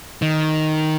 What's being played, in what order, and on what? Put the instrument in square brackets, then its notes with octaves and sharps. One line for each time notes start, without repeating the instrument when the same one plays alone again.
[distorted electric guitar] D#3